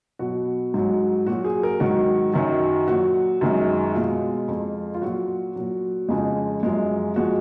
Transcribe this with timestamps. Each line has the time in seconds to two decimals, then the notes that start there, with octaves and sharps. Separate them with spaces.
0.19 B2 F#3 F#4
0.74 G#2 F#3
1.27 A#2 F#3 F#4
1.45 G#4
1.63 A#4
1.80 G#2 D#3 F#3 F#4
2.34 F#2 D#3 F#3
2.88 A#2 F#3 F#4
3.41 F#2 D#3 G#3
3.95 B2 G#3 F4
4.48 F2 F3 G#3
4.94 F4
5.02 A#2 F#3 F#4
5.56 A#2 F#3
6.09 F2 C#3 G#3 F4
6.63 F#2 F3 G#3
7.16 F3 G#3 F#4